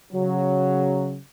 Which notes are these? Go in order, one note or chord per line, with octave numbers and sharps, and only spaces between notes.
C#3 F#3